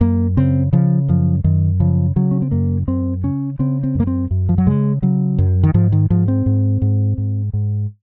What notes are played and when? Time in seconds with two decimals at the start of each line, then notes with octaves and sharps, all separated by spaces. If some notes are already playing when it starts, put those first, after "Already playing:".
0.01 F#2 A#3
0.37 C#3 C4
0.73 C#3 F3
1.08 F#2 F3
1.44 F#2 D#3
1.80 C#3 F3
2.16 C#3 F#3
2.31 C#4
2.42 C4
2.51 F#2 A#3
2.88 F#2 C4
3.23 C#3 C#4
3.59 C#3 C4
3.83 C4
3.95 F#2 A#3
4.07 C4
4.31 F#2
4.49 F3
4.58 F#3
4.67 C#3 G#3
5.02 C#3 F#3
5.38 F#2
5.63 D#3
5.74 G#2 F3
5.92 D#3
6.10 G#2 F3
6.28 C4
6.46 G#2
6.82 G#2
7.18 G#2
7.53 G#2